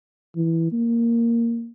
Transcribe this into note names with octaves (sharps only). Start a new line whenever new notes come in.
E3
A#3